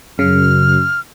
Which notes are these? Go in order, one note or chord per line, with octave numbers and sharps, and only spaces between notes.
F#2 C#3 F6